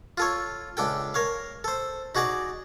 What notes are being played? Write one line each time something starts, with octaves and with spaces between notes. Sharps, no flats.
F4 A4 C#5
C#2 D4 A4 G5
A#4 C#5 F5
A4 C5
D#4 F#4 G#4 D5 D#5